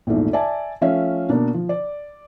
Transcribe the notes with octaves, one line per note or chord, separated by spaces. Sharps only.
A#1 E2 G#2 A3
D5 E5 G#5 A5
F3 A3 C#4 E5 F5
B2 A#3 D4
F3
D5